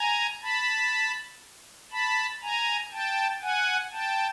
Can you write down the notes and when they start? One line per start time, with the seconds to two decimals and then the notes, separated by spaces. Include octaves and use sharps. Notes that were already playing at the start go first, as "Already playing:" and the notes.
Already playing: G#5 A#5
0.42 A5 B5
1.91 A5 B5
2.42 G#5 A#5
2.92 G5 A5
3.41 F#5 G#5
3.92 G5 A5